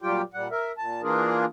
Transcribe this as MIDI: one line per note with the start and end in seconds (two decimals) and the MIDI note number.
0.02 0.22 46
0.02 0.22 54
0.02 0.22 55
0.02 0.22 65
0.02 0.22 67
0.02 0.22 79
0.34 0.48 46
0.34 0.48 55
0.34 0.48 78
0.51 0.72 70
0.51 0.72 76
0.78 1.01 46
0.78 1.01 81
1.02 1.45 52
1.02 1.45 58
1.02 1.45 62
1.02 1.45 65
1.02 1.45 68
1.02 1.45 70